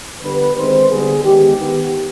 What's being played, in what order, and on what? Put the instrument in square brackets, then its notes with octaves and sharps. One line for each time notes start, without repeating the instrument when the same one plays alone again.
[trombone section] D3 G3 B3 B4
D#3 G#3 C4 C5
D3 G3 B3 G#4
D#3 G#3 B3 G4
D#3 B3